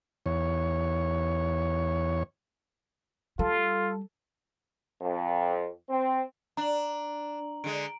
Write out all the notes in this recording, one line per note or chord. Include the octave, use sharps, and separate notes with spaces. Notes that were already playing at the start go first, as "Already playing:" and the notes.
E2 C#5
G3 F4 A4
F2
C4
D4 A#5 F#7
D3 G#3 D7